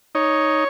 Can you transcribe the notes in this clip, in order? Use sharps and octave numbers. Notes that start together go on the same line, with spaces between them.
D#4 C#5